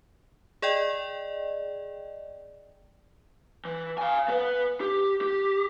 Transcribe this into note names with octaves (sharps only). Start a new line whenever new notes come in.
G#4 D5 D#5 G5
E3
F5 G#5
B3 B4
G4
G4